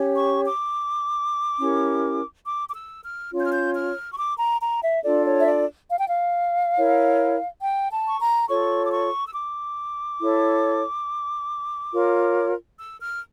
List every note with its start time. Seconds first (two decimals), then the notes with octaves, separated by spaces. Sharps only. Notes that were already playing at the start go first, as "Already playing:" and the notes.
Already playing: C#4 G4 C#5
0.16 C#6
0.44 D6
1.59 C#4 E4 G4 A#4
2.45 D6
2.69 D6
2.75 E6
3.03 F6
3.31 C#4 F4 C#5
3.38 G6
3.46 F6
3.53 G6
3.74 F6
4.12 C#6
4.18 D6
4.39 A#5
4.61 A#5
4.82 E5
5.03 D4 F4 A4 D5
5.26 C#5
5.39 E5
5.47 D5
5.89 F5
5.98 G5
6.06 F5
6.76 E4 A#4 C#5
7.62 G5
7.91 A5
8.07 C#6
8.19 A#5
8.48 F4 A4 C#5 C#6
8.85 D6
8.91 C#6
9.26 E6
9.34 D6
10.20 E4 A4 C#5
11.93 F4 A#4 C#5
12.79 E6
13.00 F6